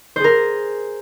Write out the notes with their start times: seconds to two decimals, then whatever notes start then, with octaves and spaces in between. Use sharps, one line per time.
0.16 C5
0.20 G#4
0.24 A#4